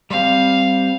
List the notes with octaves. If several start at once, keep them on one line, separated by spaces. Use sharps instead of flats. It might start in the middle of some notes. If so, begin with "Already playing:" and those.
G3 C4 F5